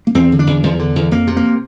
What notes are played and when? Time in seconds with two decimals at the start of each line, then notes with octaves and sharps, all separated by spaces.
0.07 A#3
0.15 E2 C4
0.32 D3
0.39 D4
0.47 E2
0.63 E2 F3
0.79 D3
0.95 E2
1.11 F2 A#3
1.27 C3
1.37 A#3